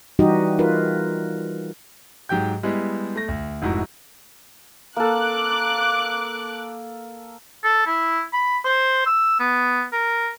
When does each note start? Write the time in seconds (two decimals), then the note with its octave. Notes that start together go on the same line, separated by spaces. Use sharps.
0.19 E3 G3 D#4 F#4 G4 D#5
0.59 F4 A#4 B4
2.29 G#2 F#3 G4 G5 G6
2.63 G3 G#3 B3 E4
3.16 A3 A#6
3.28 D2
3.62 F1 G#2 E4 F#4 A#5
4.96 A#3 A4 D6 F#6
7.64 A4
7.86 E4
8.33 B5
8.65 C5
9.06 E6
9.40 B3
9.93 A#4